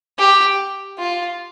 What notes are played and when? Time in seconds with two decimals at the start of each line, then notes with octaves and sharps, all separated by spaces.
0.18 G4
0.99 F4